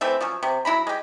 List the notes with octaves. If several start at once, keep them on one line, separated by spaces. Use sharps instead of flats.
E3 A3 C4 E5
F3 F#3 C#4
C3
F#3 E4 A#5 B5
G#3 G4